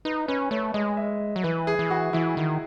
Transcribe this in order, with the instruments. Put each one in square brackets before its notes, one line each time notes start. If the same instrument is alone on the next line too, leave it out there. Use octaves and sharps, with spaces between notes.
[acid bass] D#4 [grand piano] B4
[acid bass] C#4 [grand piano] B4
[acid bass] A3 [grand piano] C#5
[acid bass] G#3 [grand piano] D#5
[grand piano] E5
[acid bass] F#3
[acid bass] E3 [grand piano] B4
[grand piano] G#4
[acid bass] E3
[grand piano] F#4
[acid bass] E3 [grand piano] E4
[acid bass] D#3